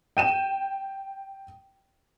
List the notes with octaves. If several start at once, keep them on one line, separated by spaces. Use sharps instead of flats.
G5 D#7 E7